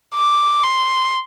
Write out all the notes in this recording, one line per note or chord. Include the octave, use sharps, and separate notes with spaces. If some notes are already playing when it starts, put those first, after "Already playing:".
D6
C6